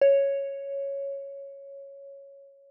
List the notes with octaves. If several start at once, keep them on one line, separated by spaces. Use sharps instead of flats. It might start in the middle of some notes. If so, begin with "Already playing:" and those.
C#5